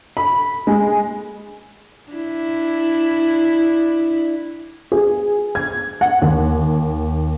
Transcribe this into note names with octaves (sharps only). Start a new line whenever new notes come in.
B5
G#3
D4 E4
G#4
G#6
F#5
D#2